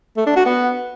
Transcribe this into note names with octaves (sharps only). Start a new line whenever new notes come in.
A3
D4
F#4
B3